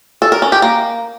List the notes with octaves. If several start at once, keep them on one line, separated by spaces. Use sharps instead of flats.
A4
A#4
C#4
G4
A#3